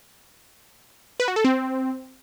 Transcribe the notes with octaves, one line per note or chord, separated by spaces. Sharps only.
B4
F#4
A4
C4